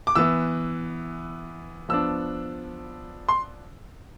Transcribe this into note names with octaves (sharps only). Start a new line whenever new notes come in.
D6
E3 B3 E4 E6
F3 B3 D4 E6
C6